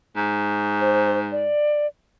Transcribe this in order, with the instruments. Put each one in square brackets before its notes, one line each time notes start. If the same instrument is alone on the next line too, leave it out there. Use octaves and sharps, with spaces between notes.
[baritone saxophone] G#2
[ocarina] C5
D5